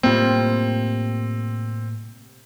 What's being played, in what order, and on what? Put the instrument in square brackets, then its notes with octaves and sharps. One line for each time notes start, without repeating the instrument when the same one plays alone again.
[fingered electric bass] A2 A#3 [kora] C3 G3 F4 [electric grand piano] C4